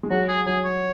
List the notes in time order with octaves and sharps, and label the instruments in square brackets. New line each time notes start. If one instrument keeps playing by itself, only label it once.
[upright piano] G#3
[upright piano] F#3 [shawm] F#4
[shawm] G#4
[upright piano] F#3 [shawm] G#4
[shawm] C#5